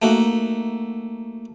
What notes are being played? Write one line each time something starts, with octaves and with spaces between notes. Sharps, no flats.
A3 A#3 D#4 F#4